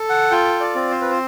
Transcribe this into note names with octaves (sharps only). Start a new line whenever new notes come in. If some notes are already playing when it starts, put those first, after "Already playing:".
Already playing: A4
F#5
F4 G5
D5
C4
C5
B4
C5